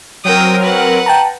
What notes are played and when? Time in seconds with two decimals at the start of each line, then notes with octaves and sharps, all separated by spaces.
0.25 F#3 C4 A#4 G5 D#6
0.62 B4 F#5
1.06 G5 A5 A#5